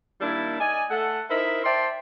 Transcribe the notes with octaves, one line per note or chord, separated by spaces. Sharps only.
D#3 G3 A#3 D4 E4
D#4 D5 D#5 G#5
A3 A4 F#5
D#4 E4 A#4 C5 D#5 E5
C5 D5 E5 G5 A5 C6